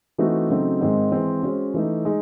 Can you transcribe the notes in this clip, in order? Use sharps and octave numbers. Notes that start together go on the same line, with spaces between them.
E3 A3 C4 D#4 F#4
C#3 F#3 A3 C4 D#4
G#2 D#3 G#3 C4
E3 G#3 C4
G#3 C#4 F#4 C5
E3 A3 D#4
G#3 D#4